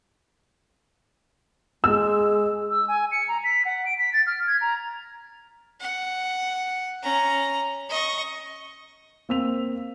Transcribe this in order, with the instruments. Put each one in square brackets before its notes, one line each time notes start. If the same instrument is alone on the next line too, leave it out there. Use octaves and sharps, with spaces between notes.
[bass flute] G#3 [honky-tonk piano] E6
[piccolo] E6
G#5
C#7
A#5
B6
F#5
D7
B6
A6
F6
G#6
A#5
[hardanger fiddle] F#5
C#4 A#5
D#5 C#6
[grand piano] A#3 C4 E6 B6 F7